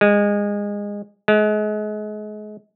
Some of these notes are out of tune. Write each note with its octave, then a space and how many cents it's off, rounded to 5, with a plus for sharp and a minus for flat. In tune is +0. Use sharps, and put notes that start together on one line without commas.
G#3 -20
G#3 +35